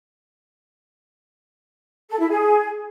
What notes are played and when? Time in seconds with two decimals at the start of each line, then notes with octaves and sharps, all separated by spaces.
2.10 A4
2.20 E4
2.30 G#4